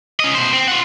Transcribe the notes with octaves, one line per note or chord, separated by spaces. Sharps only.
C#4 D#5
B2 C5
C4
F4 F#5